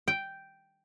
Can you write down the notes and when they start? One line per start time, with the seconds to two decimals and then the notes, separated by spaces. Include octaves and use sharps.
0.08 G5